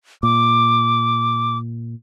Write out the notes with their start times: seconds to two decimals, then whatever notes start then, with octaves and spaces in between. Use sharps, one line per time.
0.23 A#2 D6